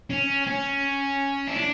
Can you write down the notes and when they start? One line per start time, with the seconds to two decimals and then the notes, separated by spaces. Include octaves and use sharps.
0.10 C#4
0.47 C#4
1.47 E4
1.56 D4